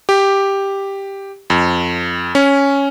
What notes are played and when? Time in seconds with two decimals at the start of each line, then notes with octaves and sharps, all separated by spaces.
0.09 G4
1.50 F2
2.35 C#4